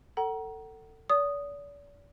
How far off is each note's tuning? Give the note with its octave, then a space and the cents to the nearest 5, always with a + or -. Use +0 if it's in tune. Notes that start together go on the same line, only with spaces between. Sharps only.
A4 +25 F#5 +35 A#5 +25
D5 -40 D#6 -5